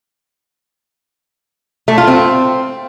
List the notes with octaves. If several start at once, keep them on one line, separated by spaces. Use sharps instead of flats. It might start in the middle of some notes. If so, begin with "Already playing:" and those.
A3
F4
C4